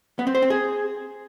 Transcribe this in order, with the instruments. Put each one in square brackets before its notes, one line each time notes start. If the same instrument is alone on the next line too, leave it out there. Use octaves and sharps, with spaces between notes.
[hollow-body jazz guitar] B3
C4
C5
C4
G#4